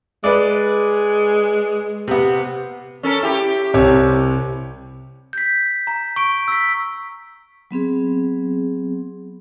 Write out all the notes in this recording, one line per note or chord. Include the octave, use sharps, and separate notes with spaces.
G#3 B4 D5
C3 B3
C#4 A4 A#4
E4 G4
C2 C3 C#5
G6 B6
A#5
C#6 D7
E6 B6
F#3 B3 C4 G#4